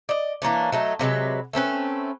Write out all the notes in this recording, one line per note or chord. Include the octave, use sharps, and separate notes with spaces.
D5 D#5
E3 A#3 C#4 D4
F#3 A3 D#4
C3 F#3 G#3 B4
A3 C4 C#4 B4